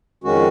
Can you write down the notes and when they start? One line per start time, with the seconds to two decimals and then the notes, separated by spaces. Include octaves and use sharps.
0.24 F2 D#3 G#3 C#4 F#4